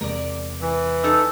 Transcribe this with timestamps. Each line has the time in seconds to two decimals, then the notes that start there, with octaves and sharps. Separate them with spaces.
0.01 E2 C3 G#3 A#4 D5
0.61 E3
1.04 D#4 A4 E6